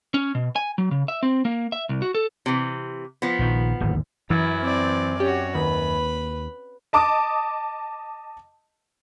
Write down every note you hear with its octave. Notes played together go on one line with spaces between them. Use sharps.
C#4
B2
G#5
F#3
C#3
E5
C4
A#3
E5
C2
F#4
A4
C3 E3
F3 B3
A#1 D#3
D1 G#1 D#2
F#2 E3 E4
C4 D5
C#4 F#4 G4 C#5
D#2 B4 B5
D#5 A5 D6 D#6